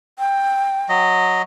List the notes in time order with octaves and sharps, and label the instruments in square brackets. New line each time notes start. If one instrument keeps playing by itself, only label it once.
[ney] G5
[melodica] F#3 D#5